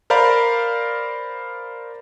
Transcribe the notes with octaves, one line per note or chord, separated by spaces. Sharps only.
A#4 C5 D5 F5 A#5 B5